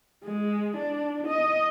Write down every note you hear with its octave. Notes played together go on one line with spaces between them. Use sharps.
G#3
D4
D#5